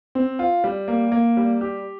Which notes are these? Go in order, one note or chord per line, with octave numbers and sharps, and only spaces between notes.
C4
F4
G3
A#3
A#3
G3
G4